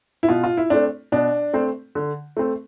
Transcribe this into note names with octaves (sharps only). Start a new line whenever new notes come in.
E4
B2 F4
F4
E4
A3 C4 D4
B2 D4
A3 C4
D3
A3 C4